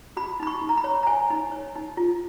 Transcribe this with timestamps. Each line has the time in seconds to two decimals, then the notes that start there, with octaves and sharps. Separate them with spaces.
0.17 F#4 B5
0.40 D#4 B5
0.47 C#6
0.61 D#4
0.69 A#5
0.77 B5
0.84 C#5
1.03 A#5
1.07 C#5 G#5
1.30 D#4
1.52 C#5
1.75 D#4
1.97 F4